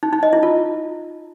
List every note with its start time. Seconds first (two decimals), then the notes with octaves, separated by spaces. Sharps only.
0.03 D#4
0.13 D#4
0.23 D#5
0.33 E4
0.43 F4